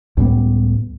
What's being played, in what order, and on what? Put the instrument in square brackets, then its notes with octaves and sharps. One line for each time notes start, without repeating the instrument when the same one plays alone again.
[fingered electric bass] C#2 A2 G3 B3